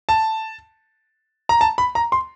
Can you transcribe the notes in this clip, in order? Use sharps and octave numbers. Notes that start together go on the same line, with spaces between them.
A5
A#5
A5
B5
A#5
C6